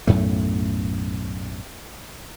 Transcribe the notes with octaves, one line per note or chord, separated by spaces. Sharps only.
B1 F#2 A2 A3